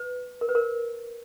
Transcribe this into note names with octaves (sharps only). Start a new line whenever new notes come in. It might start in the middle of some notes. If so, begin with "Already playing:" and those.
Already playing: B4
A#4
B4
A#4